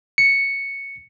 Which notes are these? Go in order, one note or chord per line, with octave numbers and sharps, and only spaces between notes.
C#7